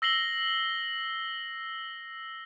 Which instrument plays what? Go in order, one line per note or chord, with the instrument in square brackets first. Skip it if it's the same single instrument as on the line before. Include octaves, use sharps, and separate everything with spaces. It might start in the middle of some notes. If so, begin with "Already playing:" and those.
[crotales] E6 A#6 C7 F#7 G7